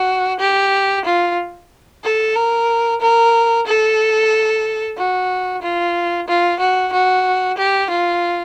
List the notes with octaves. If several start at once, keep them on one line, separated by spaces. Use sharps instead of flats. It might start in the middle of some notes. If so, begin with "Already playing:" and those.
Already playing: F#4
G4
F4
A4
A#4
A#4
A4
F#4
F4
F4
F#4
F#4
G4
F4